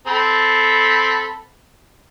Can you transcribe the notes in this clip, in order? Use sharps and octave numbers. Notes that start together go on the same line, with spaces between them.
C4 A4 B5